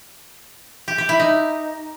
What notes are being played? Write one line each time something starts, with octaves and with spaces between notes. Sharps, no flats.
G4
G4
E4
D#4